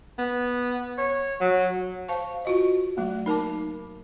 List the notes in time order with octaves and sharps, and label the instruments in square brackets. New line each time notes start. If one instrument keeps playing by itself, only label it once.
[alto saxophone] B3
C#5
F#3
[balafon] C5 F5 A5 C#6
F4 F#4 D#5
F#3 A3 A#3
D#4 A#4 A5 D6